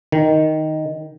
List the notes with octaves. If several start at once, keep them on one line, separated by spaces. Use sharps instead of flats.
D#3